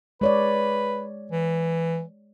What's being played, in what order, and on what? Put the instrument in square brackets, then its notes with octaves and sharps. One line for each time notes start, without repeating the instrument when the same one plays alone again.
[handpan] G#3 C#5 D5 [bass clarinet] B4
[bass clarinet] E3